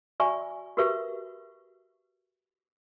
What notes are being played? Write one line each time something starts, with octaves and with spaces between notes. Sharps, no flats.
F#4 D5 E5 G#5 B5 C#6
F#4 G4 A#4 B4 E5 C#6